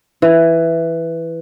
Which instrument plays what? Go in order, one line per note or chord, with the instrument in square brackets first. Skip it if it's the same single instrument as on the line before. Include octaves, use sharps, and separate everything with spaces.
[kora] E3